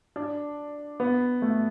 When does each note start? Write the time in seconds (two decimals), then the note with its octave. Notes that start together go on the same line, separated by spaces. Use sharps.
0.16 D4
1.00 B3
1.42 A3